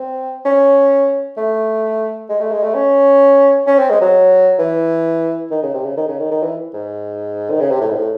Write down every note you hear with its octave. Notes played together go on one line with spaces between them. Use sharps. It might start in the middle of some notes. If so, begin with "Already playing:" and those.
Already playing: C4
C#4
A3
G#3
A3
G#3
A3
C#4
C#4
C4
G#3
F#3
E3
D#3
C#3
C3
C#3
D#3
C#3
D#3
D#3
E3
G#2
D#3
C#3
C3
A2
G#2
A2